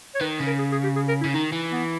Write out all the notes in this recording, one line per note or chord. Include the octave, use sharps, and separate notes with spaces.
C#5
D#3 B4
C#3
A#4
G#4
G#4
G4
G#4
A#4
E4
C#3
D#3 D#4
E3
B3